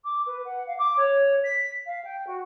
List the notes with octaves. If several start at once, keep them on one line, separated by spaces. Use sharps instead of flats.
D6
B4
F#5
F5
D6
C#5
B6
F5
G5
F#4